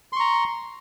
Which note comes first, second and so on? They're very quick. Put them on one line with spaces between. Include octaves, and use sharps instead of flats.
C6 C#6 A#5